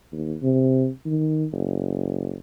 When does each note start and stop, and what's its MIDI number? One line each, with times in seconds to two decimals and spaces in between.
0.12 0.35 39
0.42 0.88 48
1.06 1.45 51
1.52 2.37 30